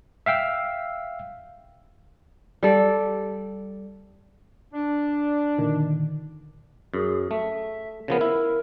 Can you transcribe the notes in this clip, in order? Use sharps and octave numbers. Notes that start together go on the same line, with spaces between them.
E5 F5 G5 E6
G3 A4 D5
D4
A#2 D3 D#3
F#2 G#4
A3 E5
C#3 F3 B3 A#4
E4